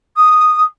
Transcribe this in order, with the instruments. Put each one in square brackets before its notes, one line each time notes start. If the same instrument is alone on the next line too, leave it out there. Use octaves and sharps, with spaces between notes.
[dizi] D#6